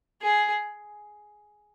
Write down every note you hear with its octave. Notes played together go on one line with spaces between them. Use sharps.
G#4